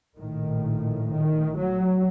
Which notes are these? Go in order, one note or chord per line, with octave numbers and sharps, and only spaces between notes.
A#1 A2 D#3
D#3
F#3